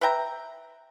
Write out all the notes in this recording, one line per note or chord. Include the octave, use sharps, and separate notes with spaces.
B4 E5 G5 A#5